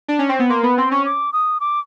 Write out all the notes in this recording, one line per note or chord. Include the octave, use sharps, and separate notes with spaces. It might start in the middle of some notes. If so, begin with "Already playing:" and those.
D4
C#4
C4
B3
A#3 C6
B3 B5
C4 C6
C#4 C#6
D6
D#6
D6